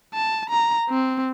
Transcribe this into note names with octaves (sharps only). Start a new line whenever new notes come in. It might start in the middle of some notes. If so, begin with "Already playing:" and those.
A5
A#5
C4